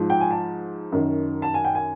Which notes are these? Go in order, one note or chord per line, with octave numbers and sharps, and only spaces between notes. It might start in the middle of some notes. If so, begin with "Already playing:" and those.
Already playing: G#2 F3
G5
G#5
A5
F#2 D#3
A5
G#5
G5
G#5